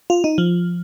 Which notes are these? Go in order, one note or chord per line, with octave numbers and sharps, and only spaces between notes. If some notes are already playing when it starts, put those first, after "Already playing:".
F4
D#4
F3